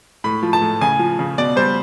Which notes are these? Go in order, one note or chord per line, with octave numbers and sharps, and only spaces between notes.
A2 B5
F3
A5
A2
C#3 G#5
F3
C#3
B2 D5
G3 C5